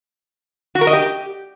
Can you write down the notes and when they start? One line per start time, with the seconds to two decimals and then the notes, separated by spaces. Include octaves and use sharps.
0.75 F#4
0.81 A#4
0.87 D#5
0.93 G4